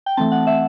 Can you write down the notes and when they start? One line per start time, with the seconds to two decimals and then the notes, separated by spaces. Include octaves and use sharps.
0.06 G5
0.17 E3 A3 C4 A5
0.32 F#5
0.47 E5